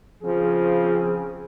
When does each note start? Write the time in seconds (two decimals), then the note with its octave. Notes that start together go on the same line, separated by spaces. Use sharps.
0.23 C#3 F3 C4 G#4